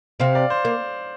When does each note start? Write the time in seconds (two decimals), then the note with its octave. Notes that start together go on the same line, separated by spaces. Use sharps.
0.20 C3 C4 F5
0.35 D5
0.50 C5
0.65 A#3